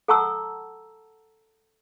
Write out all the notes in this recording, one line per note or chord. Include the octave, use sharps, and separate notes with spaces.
A4 F#5 A5 A#5 C#6 E6